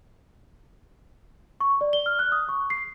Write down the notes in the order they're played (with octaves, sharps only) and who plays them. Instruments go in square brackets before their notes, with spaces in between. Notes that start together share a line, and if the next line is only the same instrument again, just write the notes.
[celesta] C#6
D5
G7
F6
F#6
D#6
C#6
C7